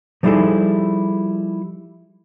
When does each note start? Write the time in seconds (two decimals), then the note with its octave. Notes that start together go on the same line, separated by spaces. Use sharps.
0.23 F3 G3 D#4 E4 G#4 A4